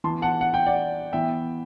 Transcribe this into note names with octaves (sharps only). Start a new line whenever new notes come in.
E3 B3 A5 C6
F#5 A5
F#5
G5
D5 F#5
E3 B3 E5 G5